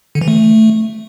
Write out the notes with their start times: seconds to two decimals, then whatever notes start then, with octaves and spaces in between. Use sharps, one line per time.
0.15 D3
0.21 E3
0.28 A3